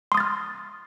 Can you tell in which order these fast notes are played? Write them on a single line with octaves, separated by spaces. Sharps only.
C6 D#6 A6 F6